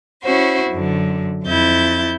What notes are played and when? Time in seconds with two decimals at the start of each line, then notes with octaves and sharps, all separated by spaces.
0.23 C#4 E4 F#4 C5
0.70 F#2 D3
1.44 F2 E4 G6 A6